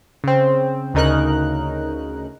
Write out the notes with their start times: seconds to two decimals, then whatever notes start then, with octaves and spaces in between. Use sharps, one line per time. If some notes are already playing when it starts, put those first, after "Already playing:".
0.24 C#3 C4
0.94 D2 C#3 D#4 A#4 F#6